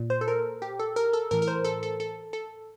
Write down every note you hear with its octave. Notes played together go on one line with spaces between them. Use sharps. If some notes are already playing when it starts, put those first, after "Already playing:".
Already playing: A#2
C5
A4
A#4
G4
A4
A#4
A4
A2 E3 A#4
A#4
C5
A4
A4
A4
A4